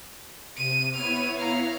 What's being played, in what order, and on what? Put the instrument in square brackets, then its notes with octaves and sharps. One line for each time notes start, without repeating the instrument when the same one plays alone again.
[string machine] C3 [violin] D#7
[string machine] B3 E4 C#5 [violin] F6 D#7
[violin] F5 A#5